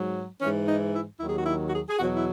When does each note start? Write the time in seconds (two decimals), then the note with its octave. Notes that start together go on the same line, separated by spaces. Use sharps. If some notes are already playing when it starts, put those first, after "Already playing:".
Already playing: G#2 F#3
0.41 G#2 E3 C#4
0.67 D#4
0.93 E4
1.20 D#2 D#3 F#3 E4
1.29 G#4
1.38 F#4
1.46 E4
1.67 F#4
1.72 G#4
1.88 G#4
1.98 E2 B2 F#3 F#4
2.14 E4